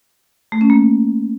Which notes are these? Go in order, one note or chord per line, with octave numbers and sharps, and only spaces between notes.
A3
C#4
A#3